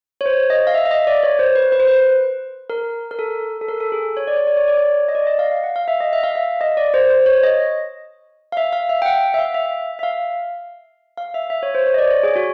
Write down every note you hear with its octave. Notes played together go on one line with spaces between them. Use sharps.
C#5
C5
D#5
F5
E5
E5
D#5
D5
C#5
C5
B4
B4
C5
B4
A#4
A#4
A4
A4
A#4
A4
G#4
C#5
D5
C#5
D5
C#5
D5
C#5
D#5
D5
D#5
F5
F5
F#5
F5
E5
D#5
E5
F5
E5
D#5
D5
C5
C5
C#5
D#5
F5
E5
F5
E5
G5
F#5
E5
F5
E5
E5
F5
F5
E5
E5
C#5
C5
C#5
D#5
D5
C#5
G#4
F#4